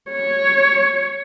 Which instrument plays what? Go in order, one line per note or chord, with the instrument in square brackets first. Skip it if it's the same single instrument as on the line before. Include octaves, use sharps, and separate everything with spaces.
[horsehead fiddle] C#5